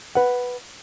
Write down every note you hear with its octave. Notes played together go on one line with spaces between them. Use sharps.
B4 F#5